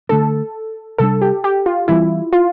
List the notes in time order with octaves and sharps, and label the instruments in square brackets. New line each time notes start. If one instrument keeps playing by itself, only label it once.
[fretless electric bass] D3 A3 D4 [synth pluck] A4
[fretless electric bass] C3 G3 D4 [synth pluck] A4
[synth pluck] G4
G4
F4
[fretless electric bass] E3 G3 C4 [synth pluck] E4
[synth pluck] F4